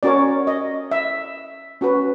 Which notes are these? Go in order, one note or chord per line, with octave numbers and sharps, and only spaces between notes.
C#4 F#4 A#4 C#5 D5
D#5
E5
C#4 F#4 B4